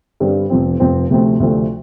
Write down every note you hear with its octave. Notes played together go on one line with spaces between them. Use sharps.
G2 D3 G3 C4
F1 F2 F3 C4
F1 F2 F3 C4
D2 C3 F3 A3 C4
D2 C3 F3 A3 C4